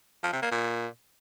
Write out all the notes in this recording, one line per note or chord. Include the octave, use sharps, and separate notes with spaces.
F3
C3
A#3
A#2